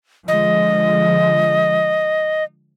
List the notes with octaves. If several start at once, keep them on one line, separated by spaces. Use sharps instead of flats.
D3 F3 G#3 D#5